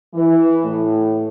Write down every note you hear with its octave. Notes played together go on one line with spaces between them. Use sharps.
E3
A2